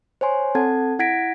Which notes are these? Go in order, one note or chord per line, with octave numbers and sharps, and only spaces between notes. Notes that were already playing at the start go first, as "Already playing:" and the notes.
C5 C#5 G#5 C6
C4 A4 F#5 A5 G#6
E4 F#5 G#6 A#6 B6 D7